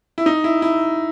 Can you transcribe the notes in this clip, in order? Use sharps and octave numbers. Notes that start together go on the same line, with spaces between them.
E4
D#4
E4
E4